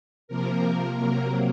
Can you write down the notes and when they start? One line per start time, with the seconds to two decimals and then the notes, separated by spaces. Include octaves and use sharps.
0.28 C3 F3 A#3 A#4
0.95 C3 F#3 A#3 A#4